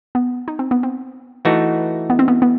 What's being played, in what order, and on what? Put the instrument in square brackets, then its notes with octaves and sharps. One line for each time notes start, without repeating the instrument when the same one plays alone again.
[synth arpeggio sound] B3
D#4
C4
B3
C4
[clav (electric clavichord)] E3 A3 D#4 F#4
[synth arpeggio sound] B3
C4
B3
B3